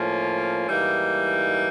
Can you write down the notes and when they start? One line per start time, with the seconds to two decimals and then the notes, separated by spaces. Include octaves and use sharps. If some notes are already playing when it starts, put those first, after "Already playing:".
Already playing: A2 F3 A#3 C#4 F4
0.68 G#2 E3 G3 A#3 D#4